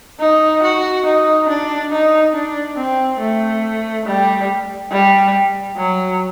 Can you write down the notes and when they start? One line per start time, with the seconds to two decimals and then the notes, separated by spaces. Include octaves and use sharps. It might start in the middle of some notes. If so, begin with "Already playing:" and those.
0.20 D#4
0.63 F#4
1.05 D#4
1.49 D4
1.92 D#4
2.35 D4
2.77 C4
3.20 A3
4.05 G3
4.91 G3
5.77 F#3